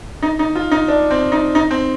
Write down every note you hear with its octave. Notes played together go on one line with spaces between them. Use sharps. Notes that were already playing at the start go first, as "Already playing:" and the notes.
D#4
D#4
F4
D#4
D4
C4
D#4
D#4
C4